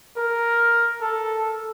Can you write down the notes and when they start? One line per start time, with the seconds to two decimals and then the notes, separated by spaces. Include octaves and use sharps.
0.17 A#4
1.01 A4